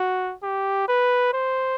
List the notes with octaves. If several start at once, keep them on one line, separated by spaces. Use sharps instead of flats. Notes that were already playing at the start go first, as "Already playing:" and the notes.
Already playing: F#4
G4
B4
C5